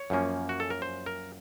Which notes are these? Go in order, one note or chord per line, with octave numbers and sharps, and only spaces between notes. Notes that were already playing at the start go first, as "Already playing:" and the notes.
Already playing: C#5
F#2 F3 A#3 C#4
F#4
A4
A#4
C5
A#4